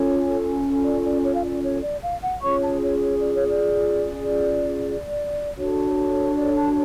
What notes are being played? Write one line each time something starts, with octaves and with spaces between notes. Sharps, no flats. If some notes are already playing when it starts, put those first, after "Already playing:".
Already playing: C#4 F4 A4 C#5
D5
D5
C#5
F5
D5
C#5
D5
F5
F#5
C#4 F4 G#4 C#5 C#6
A5
C#5
C#5
D5
C#5
D5
D4 F#4 A4 C#5
D5
A5